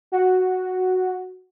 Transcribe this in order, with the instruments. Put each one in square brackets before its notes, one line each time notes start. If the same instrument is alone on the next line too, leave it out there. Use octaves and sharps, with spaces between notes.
[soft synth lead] F#4